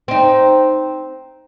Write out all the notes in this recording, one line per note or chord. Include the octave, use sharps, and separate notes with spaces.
C4 D#4